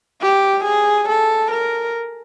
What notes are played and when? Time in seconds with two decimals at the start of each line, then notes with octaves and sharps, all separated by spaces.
0.21 G4
0.64 G#4
1.09 A4
1.51 A#4